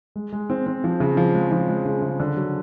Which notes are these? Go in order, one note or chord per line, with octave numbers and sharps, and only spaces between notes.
G#3
G#3
C4
C4
F3
C#3
F3
G#3
F3
G#3
C#3
C#3
D3
F#3